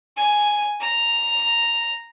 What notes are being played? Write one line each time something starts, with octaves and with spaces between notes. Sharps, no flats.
G#5
A#5